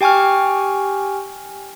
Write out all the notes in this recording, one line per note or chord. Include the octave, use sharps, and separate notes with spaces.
G4 G5 G#5 C#6 F6